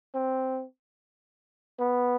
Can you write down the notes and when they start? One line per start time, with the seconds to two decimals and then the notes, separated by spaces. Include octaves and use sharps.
0.15 C4
1.79 B3